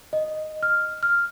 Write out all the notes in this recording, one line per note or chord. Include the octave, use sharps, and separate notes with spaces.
D#5
F6
F6